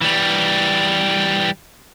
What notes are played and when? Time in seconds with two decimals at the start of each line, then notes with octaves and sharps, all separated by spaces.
0.01 E3 G3